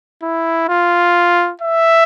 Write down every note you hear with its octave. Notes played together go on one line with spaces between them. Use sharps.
E4
F4
E5